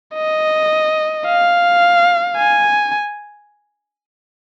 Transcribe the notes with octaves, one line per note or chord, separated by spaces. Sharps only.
D#5
F5
G#5